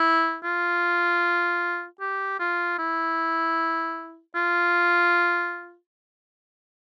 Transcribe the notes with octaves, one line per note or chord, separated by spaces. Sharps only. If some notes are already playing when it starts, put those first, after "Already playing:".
Already playing: E4
F4
G4
F4
E4
F4